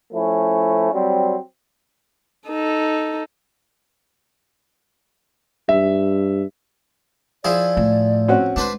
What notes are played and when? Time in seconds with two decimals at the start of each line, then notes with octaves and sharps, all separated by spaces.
0.13 F3 A3 C#4 E4
0.93 F#3 G3 C4
2.48 D#4 A4
5.69 G2 E5
7.44 F3 E4 G#4 D5
7.77 A2
8.28 C4 C#4 F#4
8.56 G#3 D4 B4 C5